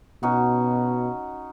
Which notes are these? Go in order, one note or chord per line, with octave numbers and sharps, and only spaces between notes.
B2 C#4 D#4 F#4